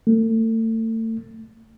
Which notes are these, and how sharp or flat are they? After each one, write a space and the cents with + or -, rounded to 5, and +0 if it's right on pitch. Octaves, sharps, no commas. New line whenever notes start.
A3 +35